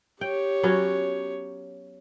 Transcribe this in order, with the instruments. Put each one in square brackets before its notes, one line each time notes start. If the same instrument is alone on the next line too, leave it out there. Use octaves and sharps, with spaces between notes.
[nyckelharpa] G4 C#5 [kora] G5
[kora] F#3 B3 C#4